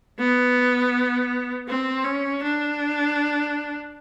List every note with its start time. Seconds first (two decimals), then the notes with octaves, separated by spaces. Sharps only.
0.19 B3
1.68 C4
2.05 C#4
2.42 D4